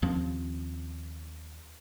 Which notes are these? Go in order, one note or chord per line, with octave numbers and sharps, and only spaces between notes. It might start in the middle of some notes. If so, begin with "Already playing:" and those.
D#2 F3 C4 C#4